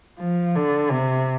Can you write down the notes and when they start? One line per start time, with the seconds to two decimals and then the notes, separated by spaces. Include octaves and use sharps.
0.20 F3
0.56 D3
0.91 C3